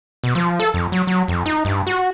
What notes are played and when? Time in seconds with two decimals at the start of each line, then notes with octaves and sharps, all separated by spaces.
0.24 B2
0.35 F3
0.60 A4
0.74 F2
0.92 F#3
1.07 F#3
1.28 F2
1.46 D#4
1.65 G2
1.87 F#4